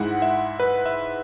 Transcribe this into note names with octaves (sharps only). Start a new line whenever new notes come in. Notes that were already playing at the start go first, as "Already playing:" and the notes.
Already playing: G#2 G#3 E4 F#5
E5
B4
E5